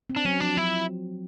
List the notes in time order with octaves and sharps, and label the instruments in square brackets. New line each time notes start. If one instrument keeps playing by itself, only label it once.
[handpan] C4
[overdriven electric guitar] D4
[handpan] F#3 [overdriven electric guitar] C#4
[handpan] F3 [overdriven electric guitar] D4
[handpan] F#3 [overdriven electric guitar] E4